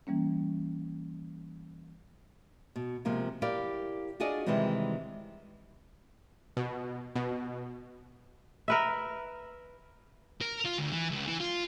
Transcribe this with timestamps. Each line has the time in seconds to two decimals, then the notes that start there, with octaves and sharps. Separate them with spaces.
0.07 E3 G3 A#3 C#4
2.76 B2
3.05 C3 F3 G#3 A#3
3.42 E4 G4 A#4 D5 F5
4.20 D4 F4 F#4 G#4 D5 D#5
4.46 C3 D#3 E3 G3 G#3 C4
6.57 B2
7.16 B2
8.68 A#4 B4 E5
10.41 A#4
10.65 F4
10.78 D2
10.92 E3
11.11 C#2
11.26 E3
11.40 F4